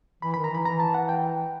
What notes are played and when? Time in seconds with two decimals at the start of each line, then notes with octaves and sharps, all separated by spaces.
0.22 E3 B5
0.34 D#3 B5
0.44 A#5
0.51 E3 B5
0.65 E3 A#5
0.80 A5
0.94 F#5
1.09 G5